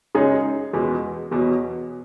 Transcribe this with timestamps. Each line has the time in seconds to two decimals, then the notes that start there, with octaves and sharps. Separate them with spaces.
0.15 F#2 C#3 G#3 D#4 G#4
0.73 E2 B2 G#3
1.31 E2 B2 F#3